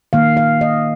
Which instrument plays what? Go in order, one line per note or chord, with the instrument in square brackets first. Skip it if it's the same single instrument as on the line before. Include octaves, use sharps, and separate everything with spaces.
[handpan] D#3 A#3 F5
F5
D#5